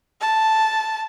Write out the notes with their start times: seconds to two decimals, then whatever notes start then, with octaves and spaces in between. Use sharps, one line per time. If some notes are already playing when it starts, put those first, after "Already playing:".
0.21 A5